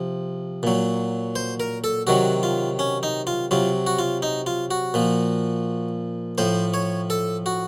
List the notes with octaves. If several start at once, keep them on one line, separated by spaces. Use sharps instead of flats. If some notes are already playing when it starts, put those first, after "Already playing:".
Already playing: C3 F3
A#2 F#3
C5
A#4
A4
C3 D#3 F#3 F#4
F4
C#4
D#4
F4
C3 F#3 F4
F#4
F4
D#4
F4
F#4
A#2 F3
A2 F3 C5
C#5
A4
F#4